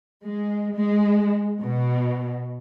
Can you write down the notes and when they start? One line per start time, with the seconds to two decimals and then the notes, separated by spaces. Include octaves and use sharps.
0.25 G#3
0.75 G#3
1.59 B2